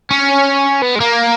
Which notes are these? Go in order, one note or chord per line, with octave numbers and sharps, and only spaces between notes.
C#4
B3
G#3
A#3